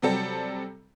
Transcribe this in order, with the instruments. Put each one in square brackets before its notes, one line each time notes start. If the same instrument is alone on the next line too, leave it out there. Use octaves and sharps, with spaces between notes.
[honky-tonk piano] C3 F#3 G3 C4 A4